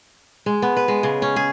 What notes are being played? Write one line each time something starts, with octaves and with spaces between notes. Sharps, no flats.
G#3
B3
B4
G#3
C#3
C#4
G#4